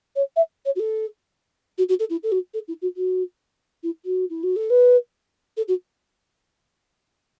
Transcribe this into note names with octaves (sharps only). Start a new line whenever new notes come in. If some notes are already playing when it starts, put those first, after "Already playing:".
C#5
E5
C#5
F#4
A4
F#4
F#4
A4
E4
A4
F#4
A4
E4
F#4
F#4
E4
F#4
E4
F#4
A4
B4
A4
F#4